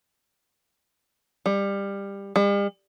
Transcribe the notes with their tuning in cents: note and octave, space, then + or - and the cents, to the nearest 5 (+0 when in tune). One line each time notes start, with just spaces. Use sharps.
G3 +20
G3 +45